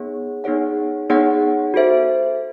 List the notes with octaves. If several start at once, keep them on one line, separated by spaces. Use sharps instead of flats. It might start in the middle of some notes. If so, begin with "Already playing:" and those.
Already playing: B3 D#4 G#4 C#5 F#5
B3 D#4 G#4 C#5 F#5
B3 D#4 G#4 C#5 F#5
F#4 A4 C5 E5